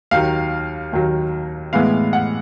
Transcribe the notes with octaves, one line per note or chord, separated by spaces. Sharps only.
D#2 D#3 F#3 F5
D#2 D#3 F#3
A2 E3 G#3 B3 F5
F#5